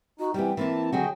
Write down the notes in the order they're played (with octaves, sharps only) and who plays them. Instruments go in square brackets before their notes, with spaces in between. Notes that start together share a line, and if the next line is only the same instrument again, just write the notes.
[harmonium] D#4 [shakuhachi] F#4
[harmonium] C3 E3 [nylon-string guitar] G3 B3 [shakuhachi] G5
[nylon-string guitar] E3 A#3 E4 [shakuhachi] C4 [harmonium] A5
[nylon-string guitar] D3 F#3 F#4 [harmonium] G#4 D#5 G5